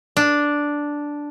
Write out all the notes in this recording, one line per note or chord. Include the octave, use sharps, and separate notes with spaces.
D4